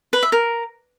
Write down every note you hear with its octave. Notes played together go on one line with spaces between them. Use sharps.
B4
E5
A#4